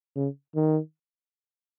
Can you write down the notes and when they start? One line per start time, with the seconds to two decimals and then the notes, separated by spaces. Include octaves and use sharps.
0.16 C#3
0.55 D#3